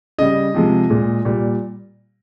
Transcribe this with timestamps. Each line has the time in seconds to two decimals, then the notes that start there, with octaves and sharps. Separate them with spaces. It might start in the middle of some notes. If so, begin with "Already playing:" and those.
0.18 C#3 G3 D#5
0.54 C3 F3 G#3
0.90 A#2 G#3
1.25 A#2 G3